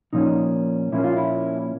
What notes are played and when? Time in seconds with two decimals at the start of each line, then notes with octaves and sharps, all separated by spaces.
0.13 A#2 F3 A#3 C#4 D#4
0.92 A#2 F3 A#3 C#4 E4
1.04 F4
1.16 E4